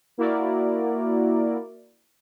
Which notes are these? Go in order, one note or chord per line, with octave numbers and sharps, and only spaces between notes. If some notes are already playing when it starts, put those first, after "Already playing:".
A#3 E4 F#4 A#4 D5